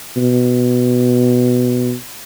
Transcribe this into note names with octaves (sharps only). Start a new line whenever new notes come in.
B2